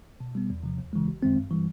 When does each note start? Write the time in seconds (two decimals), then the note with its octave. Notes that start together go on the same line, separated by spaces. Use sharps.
0.20 B2
0.35 G3 B3
0.50 E2
0.63 C3 F3
0.78 D#2
0.93 C#3 E3 G#3
1.07 G#1
1.23 F#2 D#3 G#3 C4
1.36 G2
1.51 E3 G3